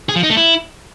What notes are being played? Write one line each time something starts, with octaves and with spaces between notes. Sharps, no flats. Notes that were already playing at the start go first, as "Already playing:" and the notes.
G#4
F3
D#4
A3
E4